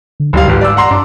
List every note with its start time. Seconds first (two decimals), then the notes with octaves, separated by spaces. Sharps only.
0.20 D3
0.33 F#1 D2 G3 F5
0.48 G1 G#2 G3
0.61 D5 E6
0.77 F#5 A#5 C6
0.91 G2 D4